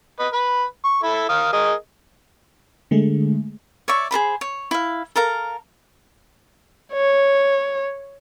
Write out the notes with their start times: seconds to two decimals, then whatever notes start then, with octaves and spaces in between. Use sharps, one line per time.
0.19 B4 D#5
0.33 B4 B5
0.84 C#6
1.03 E4 A4 B5
1.29 A#4 F5 D#6
1.53 G#4 A#4 D#5
2.91 D3 G#3 A3 G#4
3.88 C#5 D5 E5 C#6
4.11 G#4 A#4 C5 B5
4.41 C#5
4.71 E4 F5
5.16 A4 A#4 F5 A#5
6.93 C#5